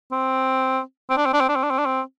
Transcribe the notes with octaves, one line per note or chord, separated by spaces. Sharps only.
C4
C4
D4
C4
D4
C4
D4
C4
D4
C4
D4
C4